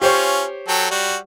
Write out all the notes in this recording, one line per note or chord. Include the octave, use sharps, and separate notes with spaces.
C#4 F4 G4 C5 C#5
F#3 A4 G5
G3 F#4